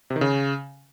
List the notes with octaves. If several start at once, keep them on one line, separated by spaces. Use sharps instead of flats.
C3
D#3
C#3